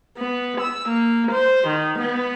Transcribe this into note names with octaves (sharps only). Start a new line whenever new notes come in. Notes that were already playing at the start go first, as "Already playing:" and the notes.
B3
E6
A#3
C5
D#3
B3